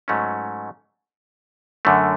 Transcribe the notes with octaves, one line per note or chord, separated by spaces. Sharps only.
G#2 F#3 A3 C#4
F#2 D3 A3